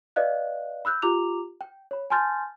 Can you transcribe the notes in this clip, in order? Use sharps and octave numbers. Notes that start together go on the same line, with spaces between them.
B4 D5 D#5 F5 F#6
B5 E6 F#6 G6
F4 G4 A#5 D6 F7
G5
C#5 B5
G#5 A5 C6 F6 G6 A6